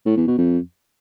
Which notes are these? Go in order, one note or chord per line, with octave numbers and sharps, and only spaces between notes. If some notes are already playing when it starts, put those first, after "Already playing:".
A2
E2
B2
F2